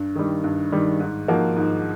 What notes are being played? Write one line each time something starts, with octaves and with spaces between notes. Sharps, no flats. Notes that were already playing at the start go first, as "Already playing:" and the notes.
Already playing: G2
D#3 G3
G2
D#3 G3
G#2
F3 A#3 D#4 F#4
G#2